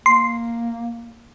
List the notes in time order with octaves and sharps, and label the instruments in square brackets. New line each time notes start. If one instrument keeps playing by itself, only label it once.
[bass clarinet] A#3 [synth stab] C6